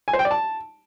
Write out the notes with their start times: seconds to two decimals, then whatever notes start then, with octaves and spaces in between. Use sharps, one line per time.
0.08 G#5
0.13 C5
0.19 G5
0.25 D5
0.31 A5